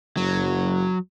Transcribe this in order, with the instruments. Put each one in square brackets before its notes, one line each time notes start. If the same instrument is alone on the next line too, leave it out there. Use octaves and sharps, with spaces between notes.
[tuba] F#1 [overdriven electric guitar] F#3